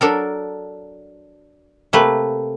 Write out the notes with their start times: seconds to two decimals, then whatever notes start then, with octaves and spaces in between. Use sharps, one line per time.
0.01 F#3 D4 A4 A#4
1.93 C3 A3 A#3 B4